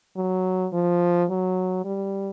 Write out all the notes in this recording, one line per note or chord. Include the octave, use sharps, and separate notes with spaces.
F#3
F3
F#3
G3